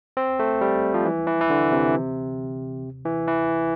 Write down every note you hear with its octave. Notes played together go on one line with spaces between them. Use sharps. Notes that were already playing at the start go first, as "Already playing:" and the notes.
C4
A3
G3
F3
E3
E3
E3
D3
C3
E3
E3